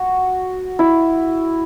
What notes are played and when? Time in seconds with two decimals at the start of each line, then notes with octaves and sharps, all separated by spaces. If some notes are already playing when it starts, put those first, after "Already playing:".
Already playing: F#4
0.79 E4